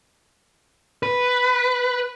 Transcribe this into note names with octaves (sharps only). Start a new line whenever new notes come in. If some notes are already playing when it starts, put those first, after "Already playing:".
B4